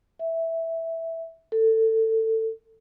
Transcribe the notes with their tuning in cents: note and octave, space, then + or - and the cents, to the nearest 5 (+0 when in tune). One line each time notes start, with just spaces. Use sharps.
E5 -5
A4 +20